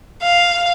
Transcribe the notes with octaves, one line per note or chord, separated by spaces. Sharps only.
F5